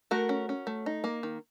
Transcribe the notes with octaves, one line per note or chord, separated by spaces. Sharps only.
A3 F#4 A#4
C#4
C#4
A3
D#4
A#3
D#3